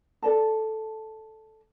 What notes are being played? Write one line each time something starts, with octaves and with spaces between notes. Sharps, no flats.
A4 D5 A5